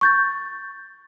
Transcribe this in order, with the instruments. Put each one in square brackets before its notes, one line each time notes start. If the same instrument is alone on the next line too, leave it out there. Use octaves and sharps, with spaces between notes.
[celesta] C#6 G6 A6